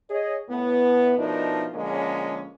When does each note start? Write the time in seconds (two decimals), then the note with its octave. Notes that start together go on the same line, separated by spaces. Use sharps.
0.10 G#4 C#5 D#5
0.50 A2 B3
1.18 B2 F3 A3 D4 D#4 A#4
1.74 D3 F3 G#3 A#3 C#4